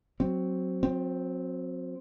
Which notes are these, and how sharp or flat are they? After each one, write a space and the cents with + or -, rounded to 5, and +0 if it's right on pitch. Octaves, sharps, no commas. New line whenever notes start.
F#3 +0 C4 +0
F#3 -35 C4 +0